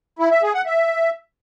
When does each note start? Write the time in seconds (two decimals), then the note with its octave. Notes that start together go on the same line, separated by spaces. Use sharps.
0.19 E4
0.31 E5
0.42 G#4
0.54 F#5
0.66 E5